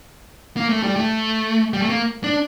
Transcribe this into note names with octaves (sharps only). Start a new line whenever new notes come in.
A#3
A3
G3
A3
G3
A3
A#3
D4